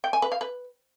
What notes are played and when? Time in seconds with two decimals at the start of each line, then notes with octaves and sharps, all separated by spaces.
0.04 G5
0.13 G#5
0.22 B4
0.32 F5
0.41 B4